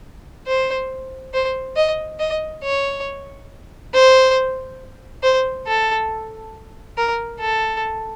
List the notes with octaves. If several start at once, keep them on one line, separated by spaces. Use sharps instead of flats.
C5
C5
D#5
D#5
C#5
C5
C5
A4
A#4
A4